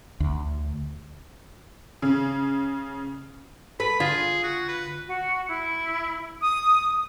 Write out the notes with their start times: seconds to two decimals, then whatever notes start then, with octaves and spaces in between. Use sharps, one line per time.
0.20 D2
2.02 C#3
3.80 A4 B4 B5
4.00 D3 F4 G#4
4.43 F#4
4.68 B4
5.07 F#4
5.48 E4
6.42 D#6